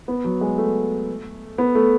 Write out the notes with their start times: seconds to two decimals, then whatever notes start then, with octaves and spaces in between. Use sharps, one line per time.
0.08 B3
0.25 F#3
0.41 G#3
0.58 A3
1.58 B3
1.75 A3